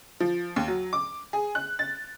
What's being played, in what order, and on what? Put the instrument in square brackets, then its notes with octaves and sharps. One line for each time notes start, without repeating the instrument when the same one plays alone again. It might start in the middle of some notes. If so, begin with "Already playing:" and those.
[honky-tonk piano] F3
D#2
F#3
D6
G#4
F#6
A6